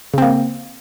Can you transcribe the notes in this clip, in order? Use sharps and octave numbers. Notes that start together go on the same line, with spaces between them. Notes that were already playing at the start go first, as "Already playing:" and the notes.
C#3 A#3 C4